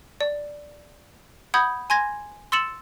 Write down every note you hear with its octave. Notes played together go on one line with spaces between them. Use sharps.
D5
F#5 B5 D#6 G6 G#6
G#5 C6 G#6 A#6
C6 E6 A6 C#7 E7 F#7